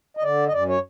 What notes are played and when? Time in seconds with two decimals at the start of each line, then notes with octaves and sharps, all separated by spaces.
0.17 D#5
0.23 D3 D5
0.47 D#5
0.53 F#2 D5
0.68 C#5